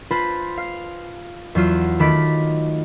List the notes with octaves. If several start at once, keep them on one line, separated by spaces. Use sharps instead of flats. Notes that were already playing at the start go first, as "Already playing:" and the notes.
F4 B4 C5 A5 B5
F5
E2 F#3 F4 E7
D#3 A3 A5 B5 D6 B6